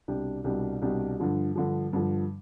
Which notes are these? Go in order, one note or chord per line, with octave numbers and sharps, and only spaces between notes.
C2 B2 G3 D4 G4
C2 B2 G3 D4 G4
C2 B2 G3 D4 G4
G2 D3 F3
G2 D3 F3
G2 D3 F3